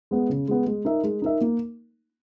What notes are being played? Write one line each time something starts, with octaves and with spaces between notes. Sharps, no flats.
G#3 B3
C#3
G#3 B3
G#3
D#4 A#4 E5
G#3
D#4 A#4 E5
A#3